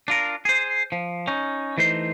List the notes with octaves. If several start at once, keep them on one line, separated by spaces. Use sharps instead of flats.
D4 F4 A#4
G#4 C5
F3
C#4 D#4
E3 A3 D#4 C5 C6